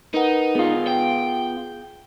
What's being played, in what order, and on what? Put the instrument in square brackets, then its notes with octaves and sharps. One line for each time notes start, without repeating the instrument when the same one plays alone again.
[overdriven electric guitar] D#4 [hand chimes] A#4 B4 F#5
[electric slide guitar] B3 F4 [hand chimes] G#4
[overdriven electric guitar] G5